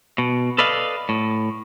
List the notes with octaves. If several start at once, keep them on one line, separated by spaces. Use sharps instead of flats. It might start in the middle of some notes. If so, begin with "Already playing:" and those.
B2
A4 B4 D5 D#5 F5
A2